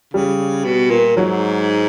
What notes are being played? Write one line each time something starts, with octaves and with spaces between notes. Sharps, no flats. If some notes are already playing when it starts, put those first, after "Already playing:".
C#3 G3
B2
A#2
G#2 F#3